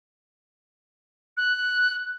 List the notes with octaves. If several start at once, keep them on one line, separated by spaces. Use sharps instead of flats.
F#6